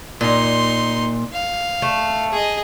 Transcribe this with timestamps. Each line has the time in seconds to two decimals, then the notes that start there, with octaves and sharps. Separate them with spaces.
0.21 A#2 D#4 C6
1.33 F5
1.82 A3
2.31 G#4 D#5